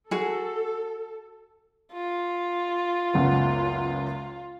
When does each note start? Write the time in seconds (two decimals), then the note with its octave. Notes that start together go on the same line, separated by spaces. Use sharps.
0.11 F#4 G#4 A4
1.92 F4
3.14 F#1 C#2 B3